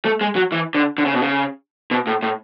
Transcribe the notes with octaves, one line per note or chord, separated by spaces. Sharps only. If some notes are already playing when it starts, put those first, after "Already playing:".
A3
G#3
F#3
E3
D3
D3
C#3
B2
C#3
B2
A2
A2